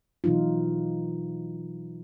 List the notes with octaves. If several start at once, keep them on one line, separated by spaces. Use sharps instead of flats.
B2 E3 F#3 D#4 F4